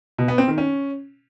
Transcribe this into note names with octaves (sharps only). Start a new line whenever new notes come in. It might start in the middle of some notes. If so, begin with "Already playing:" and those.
B2
B3
C4
D#3
C#4